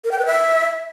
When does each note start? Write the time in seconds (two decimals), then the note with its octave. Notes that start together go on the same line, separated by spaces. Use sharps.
0.04 A#4
0.11 G5
0.19 B4
0.26 E5